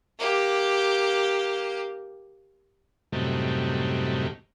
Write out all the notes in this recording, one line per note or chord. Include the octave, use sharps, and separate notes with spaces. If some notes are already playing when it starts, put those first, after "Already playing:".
A#3 G4
F#2 A2 C3 D#3 G3